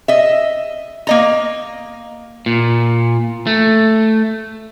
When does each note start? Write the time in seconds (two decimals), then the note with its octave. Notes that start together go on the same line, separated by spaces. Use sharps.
0.08 D#5 E5
1.07 A#3 D#5 A#5
2.46 A#2
3.47 A3